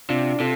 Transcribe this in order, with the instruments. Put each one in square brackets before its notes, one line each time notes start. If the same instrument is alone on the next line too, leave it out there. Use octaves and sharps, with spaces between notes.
[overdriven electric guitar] C3 [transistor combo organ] D4 F4
[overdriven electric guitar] C3 [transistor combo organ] F4 A4